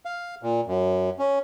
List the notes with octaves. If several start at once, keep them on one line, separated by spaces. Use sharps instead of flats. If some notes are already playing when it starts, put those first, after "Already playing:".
F5
A#2
F#2
C#4